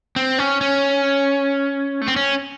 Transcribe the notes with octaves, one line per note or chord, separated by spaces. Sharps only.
C4
C#4
C#4
A3
C4
C#4